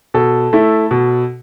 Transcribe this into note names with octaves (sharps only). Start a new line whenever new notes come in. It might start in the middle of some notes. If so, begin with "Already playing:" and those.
B2 A4
A3 E4
B2